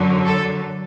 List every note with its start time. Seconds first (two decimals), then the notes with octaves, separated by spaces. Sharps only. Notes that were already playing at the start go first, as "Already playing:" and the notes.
Already playing: F#2 D3 F#3
0.26 A4